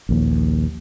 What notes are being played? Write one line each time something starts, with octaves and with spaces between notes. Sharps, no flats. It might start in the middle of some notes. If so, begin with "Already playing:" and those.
A#1 D#2